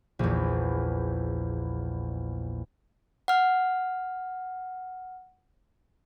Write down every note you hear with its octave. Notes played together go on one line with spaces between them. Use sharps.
A#1 E2
F#5 F6